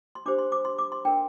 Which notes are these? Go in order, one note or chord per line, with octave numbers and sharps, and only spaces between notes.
C6
D4 G4 C5 D6
C6
D6
C6
D6
C6
D4 A#4 G5